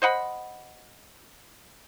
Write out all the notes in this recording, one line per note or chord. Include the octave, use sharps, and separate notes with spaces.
C5 D#5 F#5 B5